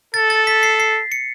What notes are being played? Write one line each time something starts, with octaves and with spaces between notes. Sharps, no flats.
A4 A6
A6
B6
C7
C7
C#7